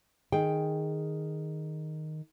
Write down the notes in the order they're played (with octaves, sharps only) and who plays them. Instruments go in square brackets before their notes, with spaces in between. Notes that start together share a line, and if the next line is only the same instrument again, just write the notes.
[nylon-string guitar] D#3 G#4 G5